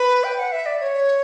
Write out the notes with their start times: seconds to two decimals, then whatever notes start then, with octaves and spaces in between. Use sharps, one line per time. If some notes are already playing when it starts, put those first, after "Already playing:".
Already playing: B4
0.24 G5
0.39 F#5
0.52 E5
0.66 D5
0.80 C#5